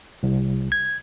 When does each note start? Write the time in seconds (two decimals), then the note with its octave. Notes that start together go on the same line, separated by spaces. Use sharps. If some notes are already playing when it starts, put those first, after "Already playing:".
0.23 C2
0.72 G#6